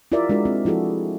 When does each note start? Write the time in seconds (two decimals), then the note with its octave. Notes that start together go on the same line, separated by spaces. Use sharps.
0.12 E4 F4 G4 A#4 D5 E5
0.29 G#3 D4 F#4 A#4
0.45 C4
0.65 F3 E4 F#4 G#4 A4